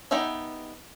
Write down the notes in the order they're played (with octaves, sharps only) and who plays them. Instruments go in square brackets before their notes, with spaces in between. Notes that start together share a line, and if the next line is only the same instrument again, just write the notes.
[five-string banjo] B3 D#4 G4 E5 G#5